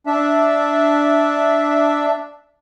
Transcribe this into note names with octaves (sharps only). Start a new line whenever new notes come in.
D4 E5